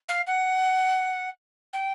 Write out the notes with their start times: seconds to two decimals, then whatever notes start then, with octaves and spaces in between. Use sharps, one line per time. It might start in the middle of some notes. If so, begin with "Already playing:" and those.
0.08 F5
0.27 F#5
1.73 G5